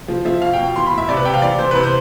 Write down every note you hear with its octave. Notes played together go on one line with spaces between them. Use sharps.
F3
F3 E5
B2 F5
G5
B2
E3 C6
B5
A2
E5
C3 D5
B4
C3 G5
F5
E3 D5
E3 C5
C3 B4
C5